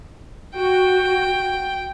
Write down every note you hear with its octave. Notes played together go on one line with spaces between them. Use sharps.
F#4 G5